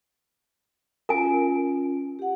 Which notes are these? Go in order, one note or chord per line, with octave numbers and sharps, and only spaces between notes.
C#4 F4 A#4 G#5
G4 F#5